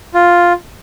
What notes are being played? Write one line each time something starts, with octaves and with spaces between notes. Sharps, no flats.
F4